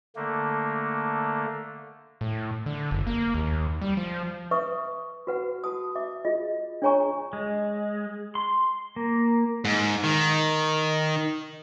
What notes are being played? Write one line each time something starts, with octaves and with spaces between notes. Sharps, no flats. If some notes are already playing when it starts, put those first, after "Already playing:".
D3 A3 A#3
A2
D3
F#1
A#3
D#2
G3
F3
B4 E5 C#6 D#6
F#4 B4 F#5
F#4 A5 D#6
E5 D6
F4 G#4 D#5
D4 G#4 C#5 G#5 A#5 C#6
G#3
C6
A#3
G#2
D#3